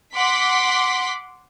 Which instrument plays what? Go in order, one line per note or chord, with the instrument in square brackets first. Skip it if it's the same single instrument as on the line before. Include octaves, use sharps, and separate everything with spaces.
[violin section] F#5 C6 D6 B6